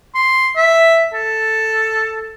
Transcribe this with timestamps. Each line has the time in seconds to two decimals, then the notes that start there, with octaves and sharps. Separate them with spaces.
0.15 C6
0.56 E5
1.13 A4